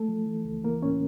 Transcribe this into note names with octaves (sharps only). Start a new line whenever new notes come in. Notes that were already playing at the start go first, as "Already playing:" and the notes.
Already playing: A3 A4
F3
E3
C#2
E3 A#3 A#4
A2 C#4 C#5